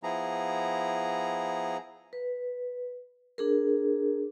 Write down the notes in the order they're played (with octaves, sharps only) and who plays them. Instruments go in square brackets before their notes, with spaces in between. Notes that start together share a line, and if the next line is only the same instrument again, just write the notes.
[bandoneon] F3 B3 E4 G#4 A#5
[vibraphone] B4
D4 G#4 A#4